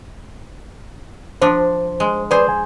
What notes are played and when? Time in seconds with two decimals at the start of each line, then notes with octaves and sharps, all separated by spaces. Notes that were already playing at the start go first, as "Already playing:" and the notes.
1.42 F3 D4 C5
2.00 G#3
2.31 G#4 B4 C5 D5
2.49 G#5